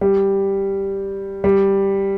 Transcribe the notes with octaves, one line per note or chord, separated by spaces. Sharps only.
G3
G3